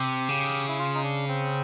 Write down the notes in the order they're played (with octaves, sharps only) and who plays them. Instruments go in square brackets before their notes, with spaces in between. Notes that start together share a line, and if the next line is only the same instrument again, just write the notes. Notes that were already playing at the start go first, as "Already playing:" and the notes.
Already playing: [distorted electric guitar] C3 [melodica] G4
[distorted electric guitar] C#3
[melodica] E4
F4
D#4
D4
C4